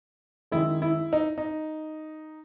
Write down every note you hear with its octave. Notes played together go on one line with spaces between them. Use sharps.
F#2 D#3 G#3 E4
E4
D#4
D#4